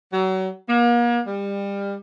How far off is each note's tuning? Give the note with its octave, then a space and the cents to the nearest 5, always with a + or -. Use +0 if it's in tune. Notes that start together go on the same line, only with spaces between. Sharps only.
F#3 +30
A#3 +40
G3 +30